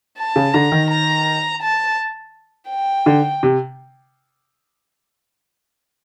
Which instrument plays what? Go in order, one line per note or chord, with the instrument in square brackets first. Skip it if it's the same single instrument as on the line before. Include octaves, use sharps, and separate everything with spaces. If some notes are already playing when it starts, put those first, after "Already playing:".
[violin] A5
[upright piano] C#3
[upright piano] D3 [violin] A#5
[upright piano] D#3
[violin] A#5
A5
G5
[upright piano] D3
C3